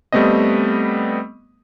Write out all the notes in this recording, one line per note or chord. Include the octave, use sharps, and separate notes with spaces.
G3 A3 B3 C4 D#5